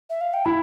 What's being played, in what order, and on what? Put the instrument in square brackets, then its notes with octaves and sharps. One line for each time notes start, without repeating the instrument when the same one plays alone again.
[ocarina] E5
F5
G5
[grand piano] E4 [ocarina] B5